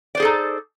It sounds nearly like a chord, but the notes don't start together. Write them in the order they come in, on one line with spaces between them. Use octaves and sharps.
D5 C5 G#4 A4 D#4